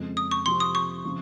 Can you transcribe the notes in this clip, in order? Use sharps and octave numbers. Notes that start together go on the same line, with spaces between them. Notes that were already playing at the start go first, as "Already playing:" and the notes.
Already playing: F2 C#3 G#3 C4
D#6
C#6
C3 F3 C4 G4 C6
D#6
C#6
C#3 F3 C4